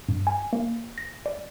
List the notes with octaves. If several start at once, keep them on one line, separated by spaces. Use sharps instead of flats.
G2
G#5
A#3
A#6
D5